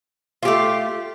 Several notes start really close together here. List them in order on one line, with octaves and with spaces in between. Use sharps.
F4 G4 A3